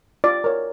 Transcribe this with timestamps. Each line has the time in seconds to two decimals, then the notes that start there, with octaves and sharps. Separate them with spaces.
0.24 F4 D5
0.44 A#4 C#5